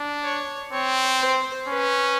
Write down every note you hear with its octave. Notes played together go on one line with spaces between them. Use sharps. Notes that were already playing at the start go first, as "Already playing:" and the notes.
Already playing: D4
C#5
C4 C#5
C5
C#4 B4